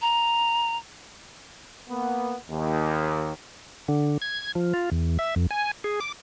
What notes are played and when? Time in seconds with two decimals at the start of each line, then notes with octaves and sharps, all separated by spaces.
0.01 A#5
1.89 A#3 B3
2.49 D#2
3.88 D3
4.22 G#6
4.55 F3
4.74 F4
4.92 E2
5.19 E5
5.36 F2
5.51 G#5
5.84 G#4
6.01 D6